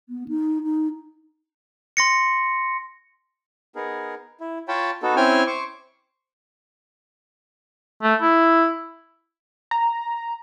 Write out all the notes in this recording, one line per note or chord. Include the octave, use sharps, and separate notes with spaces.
B3
D#4
D#4
C6 A#6 C#7
B3 D#4 G#4 A#4
E4
F4 C#5 G5 A5 B5
B3 D#4 F#4 A4
C4 C#4 E4 G5 G#5 F6
C5 C#6 D6
A3
E4
A#5